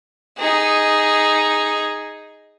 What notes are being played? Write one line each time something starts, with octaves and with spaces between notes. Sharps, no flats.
D#4 G#4